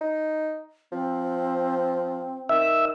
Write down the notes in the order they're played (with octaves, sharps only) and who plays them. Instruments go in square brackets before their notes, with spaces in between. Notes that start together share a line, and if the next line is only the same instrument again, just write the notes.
[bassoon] D#4
[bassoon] F3 [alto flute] C4
[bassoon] D#3 [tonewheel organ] E5